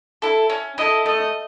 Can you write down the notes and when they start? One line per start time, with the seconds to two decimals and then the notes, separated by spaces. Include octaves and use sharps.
0.22 E4 A4
0.50 C#4
0.78 E4 A4 D#5
1.06 A3 D#5